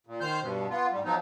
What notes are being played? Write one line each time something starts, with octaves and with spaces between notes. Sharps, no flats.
A#2
D#3 C5 F6 G6
G2 B2
B3 F4
G#2 G3
F3 F#3 B3 D#4